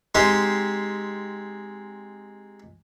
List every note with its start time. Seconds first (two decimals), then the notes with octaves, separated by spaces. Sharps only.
0.15 G#3 C4 D#4 G4 C5